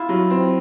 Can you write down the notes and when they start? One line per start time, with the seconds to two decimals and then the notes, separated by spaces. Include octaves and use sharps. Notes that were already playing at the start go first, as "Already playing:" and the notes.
Already playing: E4 F4
0.09 F#3
0.30 C4